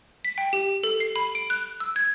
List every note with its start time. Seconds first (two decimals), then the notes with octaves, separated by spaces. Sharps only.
0.25 B6
0.38 G5
0.53 G4
0.84 A4
1.00 C7
1.16 B5
1.35 D7
1.50 F#6
1.80 E6
1.96 G#6